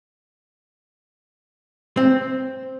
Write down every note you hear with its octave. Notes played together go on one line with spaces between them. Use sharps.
C4